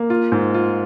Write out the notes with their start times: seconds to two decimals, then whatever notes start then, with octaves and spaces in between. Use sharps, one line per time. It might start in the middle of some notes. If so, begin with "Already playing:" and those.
Already playing: A#3
0.10 F4
0.32 G#2
0.54 F4